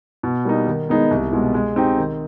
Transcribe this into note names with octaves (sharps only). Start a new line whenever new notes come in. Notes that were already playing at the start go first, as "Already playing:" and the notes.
B2
G3 A#3 D#4
D#3
G#3 B3 D#4 G#4
C2
B2 G#3
G#3
C4 D#4 G4
D#3